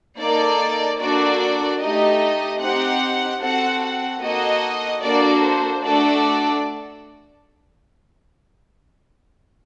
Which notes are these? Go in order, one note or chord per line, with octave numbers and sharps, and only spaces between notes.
A#3 D#4 A4 D5
A#3 D4 F#4 A4 D5
A3 D#4 G4 D#5
C4 D#4 G4 F#5
C4 F#4 A4 F#5
F#5
A#3 D#4 F#4 A4 D#5
A#3 D4 F#4 A4 D5
C5
A3 D4 F#4 A4 D5